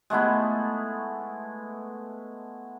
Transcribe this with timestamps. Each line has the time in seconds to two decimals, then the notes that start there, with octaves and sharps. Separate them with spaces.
0.10 G#3 A3 B3 E4